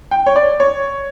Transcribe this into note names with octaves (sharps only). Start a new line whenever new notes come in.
G5
C#5
D5
C#5